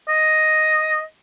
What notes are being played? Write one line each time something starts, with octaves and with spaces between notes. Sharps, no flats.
D#5